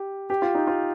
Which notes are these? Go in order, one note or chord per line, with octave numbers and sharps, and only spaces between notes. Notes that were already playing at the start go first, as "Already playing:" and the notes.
Already playing: G4
G4
F4
D#4
F4